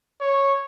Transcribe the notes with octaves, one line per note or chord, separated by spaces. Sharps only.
C#5